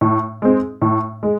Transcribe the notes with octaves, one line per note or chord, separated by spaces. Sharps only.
A2
G#3 C4
A2
G#3